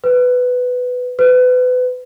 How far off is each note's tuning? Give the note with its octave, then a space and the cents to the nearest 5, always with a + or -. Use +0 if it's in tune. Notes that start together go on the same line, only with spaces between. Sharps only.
B4 +10
B4 +30